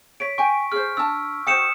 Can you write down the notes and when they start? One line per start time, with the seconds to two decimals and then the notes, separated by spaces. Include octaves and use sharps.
0.20 C#5 B6 D7
0.38 G5 G#5 C#6
0.72 G#4 C5 F6
0.97 D4 A5 E6
1.47 F#4 C5 G5 D#6 C#7 E7